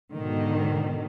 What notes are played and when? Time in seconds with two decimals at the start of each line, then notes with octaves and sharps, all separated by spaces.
0.15 G#2 B2 D3 D#3